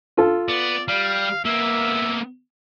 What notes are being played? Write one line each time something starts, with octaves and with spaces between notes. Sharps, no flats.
F4 A4
B3 D5
G3 F5
A#3 B3 E5